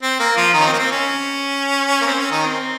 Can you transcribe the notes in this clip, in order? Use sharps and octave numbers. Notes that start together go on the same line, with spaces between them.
C4
A#3
F3 F4
D#3 D#4
C#4
C4
A#3
C4
C#4
A#3
C4
C#4
D#3 D#4
C4